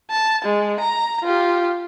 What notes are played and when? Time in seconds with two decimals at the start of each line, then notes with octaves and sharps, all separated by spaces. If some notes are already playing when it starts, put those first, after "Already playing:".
0.11 A5
0.44 G#3
0.80 A#5
1.24 F4 G4